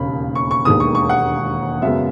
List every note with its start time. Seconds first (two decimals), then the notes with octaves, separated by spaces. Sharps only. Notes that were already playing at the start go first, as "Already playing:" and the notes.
Already playing: E1 D#2 C#3 B5
0.35 C#6
0.51 C#6
0.65 E1 D#2 D#3 G#3 B3 D#6
0.80 C#6
0.95 C#6
1.09 F#5
1.82 F#2 C#3 G#3 B3 E5